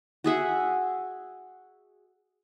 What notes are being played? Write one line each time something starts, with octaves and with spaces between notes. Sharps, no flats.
F#4 G#4 E5 F#5